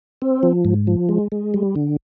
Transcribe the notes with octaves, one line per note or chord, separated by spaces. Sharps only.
C4
F3
G#2
F3
G#3
G#3
G3
D3